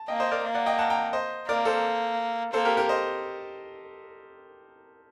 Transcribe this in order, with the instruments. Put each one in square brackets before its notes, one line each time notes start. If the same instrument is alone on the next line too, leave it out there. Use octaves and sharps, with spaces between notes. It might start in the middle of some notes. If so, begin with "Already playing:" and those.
Already playing: [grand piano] A5
[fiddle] A#3 [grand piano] D#5 G5
[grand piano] C5 D#5
A#4 D5
[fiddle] A#3
[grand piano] D5 F#5
D#5 G5
F#5 A5
G5 A#5
C5 D#5
[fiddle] A#3 [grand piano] A#4 D5
[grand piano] A4 C5
[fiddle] A#3 [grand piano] A4 C5
[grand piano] G4 A#4
G4 A#4
C5 D#5